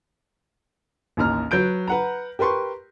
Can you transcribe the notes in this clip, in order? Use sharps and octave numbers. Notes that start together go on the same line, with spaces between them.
A1 D#2 A#5 F6
F#3 B4 G6 D7
B4 F#5 A#5
G4 A#4 B4 C6 C#6